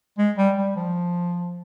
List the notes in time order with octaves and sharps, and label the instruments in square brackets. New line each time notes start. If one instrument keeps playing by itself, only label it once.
[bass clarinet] G#3
G3
G3
F3